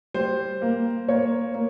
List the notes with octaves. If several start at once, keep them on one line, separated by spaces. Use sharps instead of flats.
G3 C5
A#3
A#3 C#5
A#3